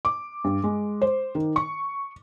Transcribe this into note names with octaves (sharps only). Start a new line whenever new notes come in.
D6
G2
G#3
C5
D#3
C#6